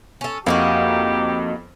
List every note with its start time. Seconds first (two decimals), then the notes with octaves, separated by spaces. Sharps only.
0.21 C#4 A4
0.46 F2 A#3 D#4 F#4 G4